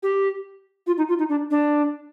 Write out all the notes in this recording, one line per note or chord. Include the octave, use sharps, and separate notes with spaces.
G4
F4
D#4
F4
D#4
D4
D4